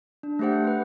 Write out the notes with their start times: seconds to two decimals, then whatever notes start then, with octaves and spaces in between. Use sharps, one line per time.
0.23 D4
0.39 A3 D4 G4 C5 F#5
0.64 B4 C5